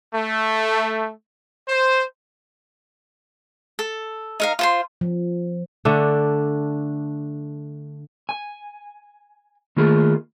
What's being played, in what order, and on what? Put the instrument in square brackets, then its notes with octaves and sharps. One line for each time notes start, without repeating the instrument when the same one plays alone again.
[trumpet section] A3
C5
[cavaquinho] A4
D#4 A#4 F5
F4 C5 C6
[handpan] F3
[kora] D3 A3 D4
[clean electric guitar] G#5
D#3 A3 A#3 F4 G#4 B5